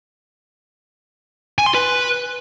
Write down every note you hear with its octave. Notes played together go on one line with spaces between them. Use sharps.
G#5
C6
B4